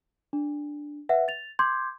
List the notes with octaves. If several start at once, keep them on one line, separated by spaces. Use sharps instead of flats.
D4
B4 E5 F#5
A6 F7
C6 D6 G6 G#6